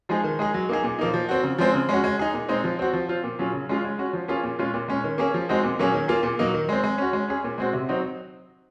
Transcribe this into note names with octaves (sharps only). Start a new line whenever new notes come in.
F3 G#3 D#4 G#4
D#3
G#3 D#4 G#4
F#3
A#3 D#4 G#4
A#2
F3 A#3 D#4
F3
C4 F#4
C#3
F3 G#3 C4
C#3
G#3 C#4 F#4
G#3
D#4 G#4
A#2
G#3 C4 D#4
F3
C4 F#4
F3
C4 F4
A#2
F#3 C#4 F4 G#4
C#3
G#3 C#4 F4 G#4
G#3
C#4 F#4
F3
A#3 C#4 F4 G#4
A#2
G#3 C#4 F4
A#2
G#3 C#4
D#3
A#3 C#4 G#4
F3
G#3 C4 D#4 F#4
A#2
F#3 A#3 C#4 G#4
D#3
A#3 F4 G#4
A#2
F#3 A#3 D#4
D#3
G#3 C4
G#3
C#4 F#4
G#3
C#4 G#4
A#2
G#3 C4 F#4
C3
F#3 C4 D#4 F#4